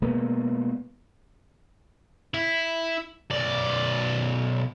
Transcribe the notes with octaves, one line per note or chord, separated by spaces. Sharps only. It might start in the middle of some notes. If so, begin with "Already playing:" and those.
B2 G#3 A#3 B3
E4
B1 D5